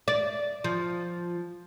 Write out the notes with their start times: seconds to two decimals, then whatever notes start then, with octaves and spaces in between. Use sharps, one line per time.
0.08 D5
0.64 F3